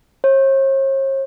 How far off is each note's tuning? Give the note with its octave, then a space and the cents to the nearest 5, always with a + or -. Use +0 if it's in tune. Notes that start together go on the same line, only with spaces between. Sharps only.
C#5 -45